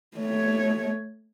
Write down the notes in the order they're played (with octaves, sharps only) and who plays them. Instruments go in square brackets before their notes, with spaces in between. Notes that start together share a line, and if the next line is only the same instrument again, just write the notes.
[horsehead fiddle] A3 C#5